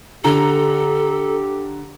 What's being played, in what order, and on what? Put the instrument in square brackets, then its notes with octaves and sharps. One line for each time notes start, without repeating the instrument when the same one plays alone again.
[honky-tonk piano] D3 A#5 [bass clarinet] G4 [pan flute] A4